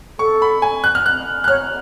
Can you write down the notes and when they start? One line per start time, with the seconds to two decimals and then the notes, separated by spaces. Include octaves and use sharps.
0.19 A4 C#6
0.42 B5
0.62 G#5
0.84 F#6
0.95 F6
1.06 F#6
1.44 F#6
1.48 C#5 F6